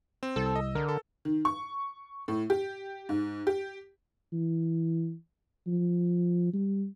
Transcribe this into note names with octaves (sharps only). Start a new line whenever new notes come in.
C4
C2 A4 E6
D#5
D3 A#4
A4
D#3
C#6
A2
G4
G#2
G4
E3
F3
G3